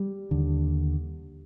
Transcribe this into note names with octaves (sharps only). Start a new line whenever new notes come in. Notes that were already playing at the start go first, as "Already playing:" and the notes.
Already playing: G3
D#2 D3